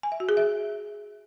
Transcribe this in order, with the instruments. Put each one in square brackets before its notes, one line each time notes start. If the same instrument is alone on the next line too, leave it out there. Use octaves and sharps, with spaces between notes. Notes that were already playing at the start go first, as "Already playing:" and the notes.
[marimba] G#5
E5
F#4
G#4
E5